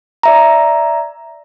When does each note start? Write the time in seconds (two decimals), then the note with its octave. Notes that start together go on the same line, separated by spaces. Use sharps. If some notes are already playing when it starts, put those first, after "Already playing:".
0.23 D5 E5 A#5